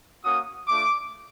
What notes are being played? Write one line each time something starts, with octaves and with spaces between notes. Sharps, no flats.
A#3 C#4 F#4 D#6
A3 D4 F4 D6